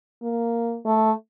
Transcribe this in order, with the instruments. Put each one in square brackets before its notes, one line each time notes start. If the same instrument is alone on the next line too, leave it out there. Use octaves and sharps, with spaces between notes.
[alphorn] A#3
A3